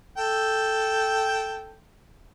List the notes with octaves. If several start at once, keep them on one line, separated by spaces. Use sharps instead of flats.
A4 G5